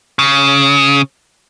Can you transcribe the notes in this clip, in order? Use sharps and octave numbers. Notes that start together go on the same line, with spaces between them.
C#3